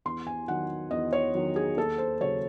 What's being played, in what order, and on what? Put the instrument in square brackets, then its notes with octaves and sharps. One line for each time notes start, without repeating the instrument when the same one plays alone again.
[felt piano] E2 C6
G#5
D#3 F#3 F#5
E2 D#5
C#5
D#3 F#3
G#4
D#2 A4
C5
C#3 F#3 C#5